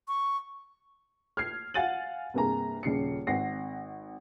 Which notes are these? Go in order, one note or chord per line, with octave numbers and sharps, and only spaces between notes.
C#6
F6 G#6 C7
F5 F#5 G#5 A6 D#7 F#7
G2 C3 A#3 G#4 A#5
D#1 C#3 C7 C#7
G#1 C4 F#5 A#6 C7